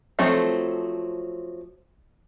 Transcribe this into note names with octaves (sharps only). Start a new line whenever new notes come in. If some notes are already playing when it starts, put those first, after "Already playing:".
F3 F#3 A3 C4 A4